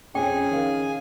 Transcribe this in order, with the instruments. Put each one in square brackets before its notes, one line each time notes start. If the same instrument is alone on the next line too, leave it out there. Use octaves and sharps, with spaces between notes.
[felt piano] F2 [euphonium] C#4 [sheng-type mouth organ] G#4 G#5 [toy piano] G5
[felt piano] D#3 A#4 F5